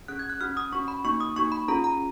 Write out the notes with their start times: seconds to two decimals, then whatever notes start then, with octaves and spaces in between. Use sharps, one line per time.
0.08 C#4 G#4 F#6
0.19 G#6
0.30 F#6
0.41 C#4 F#4 F6
0.57 D#6
0.72 C#4 F#4 C#6
0.88 B5
1.04 A#3 D#4 F#4 C#6
1.20 D#6
1.36 A#3 D#4 F#4 C#6
1.52 B5
1.68 C#4 F4 G#4 A#5
1.84 A#5